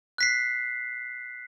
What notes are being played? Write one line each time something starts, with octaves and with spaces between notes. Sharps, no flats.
F#6 B6 C7